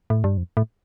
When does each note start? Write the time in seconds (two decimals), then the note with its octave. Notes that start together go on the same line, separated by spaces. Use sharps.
0.10 A2
0.24 G2
0.37 F2
0.57 A2